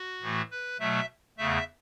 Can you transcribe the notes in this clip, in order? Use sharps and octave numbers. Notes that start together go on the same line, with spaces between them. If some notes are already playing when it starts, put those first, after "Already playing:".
Already playing: F#4
A2 E3 A3
B4
B2 F#3 A3 E5
E2 C#3 A3 E5